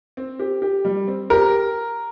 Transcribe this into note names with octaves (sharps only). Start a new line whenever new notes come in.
C4
G4
G4
G3
C4
G4 A#4